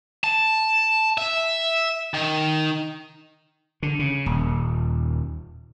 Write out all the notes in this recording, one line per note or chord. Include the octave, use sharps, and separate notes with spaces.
A5
E5
D#3
D3
C#3
D#1